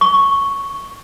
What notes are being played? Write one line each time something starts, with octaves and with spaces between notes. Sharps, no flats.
C#6